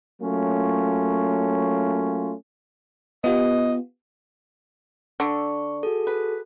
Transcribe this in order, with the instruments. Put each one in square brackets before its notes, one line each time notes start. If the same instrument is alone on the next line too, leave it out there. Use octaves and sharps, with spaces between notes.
[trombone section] F#3 A3 A#3 C#4 F4
[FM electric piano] B3 F4 G4 [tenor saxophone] D#5
[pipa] D3 [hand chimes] C#6
[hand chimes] F#4 G#4 A4
[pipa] B4